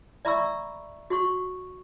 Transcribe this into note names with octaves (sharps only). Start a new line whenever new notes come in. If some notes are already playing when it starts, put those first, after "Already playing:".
D5 E5 A#5 B5 C#6 E6
F#4 C6 C#6